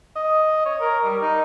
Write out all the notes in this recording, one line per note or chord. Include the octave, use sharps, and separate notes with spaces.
D#5
C#5
A#4
G3
D#4